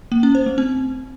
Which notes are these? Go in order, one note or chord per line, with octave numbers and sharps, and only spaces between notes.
A#3
C#4
C5
A3
C4